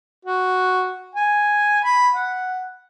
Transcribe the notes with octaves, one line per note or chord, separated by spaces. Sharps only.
F#4
G#5
B5
F#5